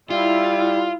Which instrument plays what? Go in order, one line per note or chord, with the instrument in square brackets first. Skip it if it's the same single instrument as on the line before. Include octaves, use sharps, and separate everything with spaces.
[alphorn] G3 [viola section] E4 [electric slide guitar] F4